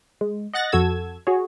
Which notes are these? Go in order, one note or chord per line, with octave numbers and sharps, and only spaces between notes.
G#3
D#5 F#5 F#6 A6 A#6
F2 F#4 A4 E6 G#6
F#4 G#4 C#5